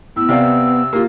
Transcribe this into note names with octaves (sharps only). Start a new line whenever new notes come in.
A2 B3 E6
C3 D5 F5
A#3 F4 G4